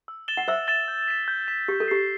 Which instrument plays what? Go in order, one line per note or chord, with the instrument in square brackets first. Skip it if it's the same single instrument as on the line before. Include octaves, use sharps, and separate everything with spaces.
[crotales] E6
A6 E7 G7
[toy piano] F#5
[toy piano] C5 E5 [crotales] E6
[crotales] A6 E7 G7
G6
B6 E7
G6
B6 E7
[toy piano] G4 [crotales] E6
[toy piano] A4
[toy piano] G4 [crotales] G6 C7